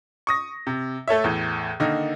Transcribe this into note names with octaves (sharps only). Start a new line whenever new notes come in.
C#6 D#6 A#6
C3
A3 A4 C#5 E5
E2 A2
D3 D#3 A#3 D#4 A4